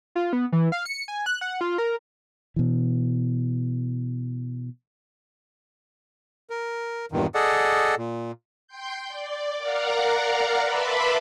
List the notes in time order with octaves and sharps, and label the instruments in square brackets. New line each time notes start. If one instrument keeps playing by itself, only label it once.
[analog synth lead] F4
B3
E3
F5
C#7
G#5
F#6
F#5
F4
A#4
[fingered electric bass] B2 E3
[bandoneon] A#4
E2 G2 A#2 D#3
G#4 A4 D5 D#5 F#5
A#2
[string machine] G5 C6 G6
D5
A#4 D5 F5 F#5 A#5
B4 E5 A5 B5 C6 D6